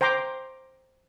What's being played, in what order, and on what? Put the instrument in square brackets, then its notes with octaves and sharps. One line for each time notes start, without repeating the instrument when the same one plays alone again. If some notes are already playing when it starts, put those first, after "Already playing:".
[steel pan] C5 G5 A#5 C6 D6